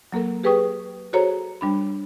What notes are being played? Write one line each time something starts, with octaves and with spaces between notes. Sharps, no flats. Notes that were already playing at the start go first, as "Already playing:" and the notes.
F#3 A#3 A4 A#4
G4 G#4 B4 G5 C#6 D#6
F#4 G#4 A4 C5 C#5 A#5
G3 D4 B5